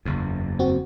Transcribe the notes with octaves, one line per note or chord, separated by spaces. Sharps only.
F#1 E2
C4 F#4